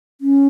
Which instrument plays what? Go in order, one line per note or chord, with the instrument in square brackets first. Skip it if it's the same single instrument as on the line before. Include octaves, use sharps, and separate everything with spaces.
[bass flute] C#4